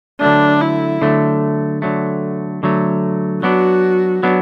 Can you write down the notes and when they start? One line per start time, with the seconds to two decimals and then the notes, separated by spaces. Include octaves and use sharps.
0.20 D3 F#3 A3 D4
0.61 E4
1.02 D3 F#3 A3
1.82 D3 F#3 A3
2.63 D3 F#3 A3
3.42 F#3 B3 D4 F#4
4.23 F#3 B3 D4